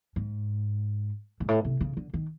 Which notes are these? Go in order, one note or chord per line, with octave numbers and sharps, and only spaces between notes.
G#2
G#2
A2
C3
C#3
D3
D#3